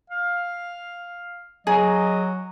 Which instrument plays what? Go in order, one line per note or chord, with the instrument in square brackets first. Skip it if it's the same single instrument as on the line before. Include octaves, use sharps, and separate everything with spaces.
[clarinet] F5
[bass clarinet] F#3 [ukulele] G#4 [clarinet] D#5